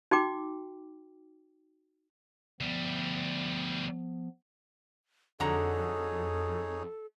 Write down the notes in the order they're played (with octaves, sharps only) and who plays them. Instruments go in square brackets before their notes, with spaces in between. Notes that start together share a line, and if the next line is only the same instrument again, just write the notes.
[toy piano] D#4 F#4 G5 D6
[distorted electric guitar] D2 G3 [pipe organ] F3 B3
[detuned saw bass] F2 [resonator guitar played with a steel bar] D3 F#3 A#5 [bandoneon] D#4 G#4 C#5 [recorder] A4